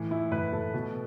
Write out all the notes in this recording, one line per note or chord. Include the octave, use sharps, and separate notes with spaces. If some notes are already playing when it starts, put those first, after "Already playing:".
Already playing: A2 E3
E3 E4
A2 B4
A2 A4
B2